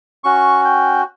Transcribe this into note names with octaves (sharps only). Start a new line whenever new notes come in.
C#4 F#4 C#6
G5